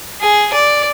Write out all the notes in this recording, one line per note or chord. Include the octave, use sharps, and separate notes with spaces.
G#4
D5